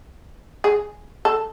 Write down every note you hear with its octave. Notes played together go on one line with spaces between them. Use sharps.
G#4
A4